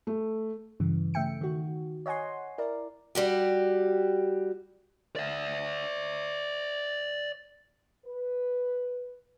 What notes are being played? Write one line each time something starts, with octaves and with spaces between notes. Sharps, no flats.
A3
G2 C#3 E3
C#3 A3 E5 G5 C#7
D#3 F#4
C#5 D#5 F#5 G#5 C6
E4 A#4 D5
G3 F#4 G4
D5 E5
B4